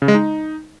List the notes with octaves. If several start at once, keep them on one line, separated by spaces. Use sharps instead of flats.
C#3
G#3
D#4